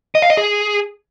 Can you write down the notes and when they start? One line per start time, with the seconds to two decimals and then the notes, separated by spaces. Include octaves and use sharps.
0.15 D#5
0.22 F5
0.30 D#5
0.37 G#4